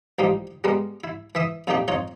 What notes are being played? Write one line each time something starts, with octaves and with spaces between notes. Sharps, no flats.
A1 F3 G3 D#4
G3 G#3 B3 A#4
E4
E3 E5 D#6
F2 A#2 A3 D#4 G4 G5
F2 D#4 F4 C#5 A#5